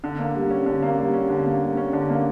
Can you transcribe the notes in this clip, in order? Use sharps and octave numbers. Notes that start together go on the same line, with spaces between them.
D3
A#3
G3
C#4
D3
A#3
G3
C#4
D3
A#3
G3
C#4
D3
A#3